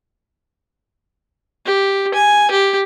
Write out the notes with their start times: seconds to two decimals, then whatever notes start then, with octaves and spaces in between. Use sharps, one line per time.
1.66 G4
2.14 G#5
2.51 G4